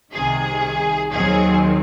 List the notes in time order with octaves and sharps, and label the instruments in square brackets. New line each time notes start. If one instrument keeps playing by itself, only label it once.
[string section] C2 C3 D#3 G#4
D#2 D#3 F#3 C4 G#4